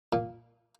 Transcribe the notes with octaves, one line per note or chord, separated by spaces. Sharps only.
A#2